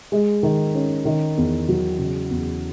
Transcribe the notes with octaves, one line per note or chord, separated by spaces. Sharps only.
G#3
D#3
C#4
D#3
E2
F#3
C#3
E2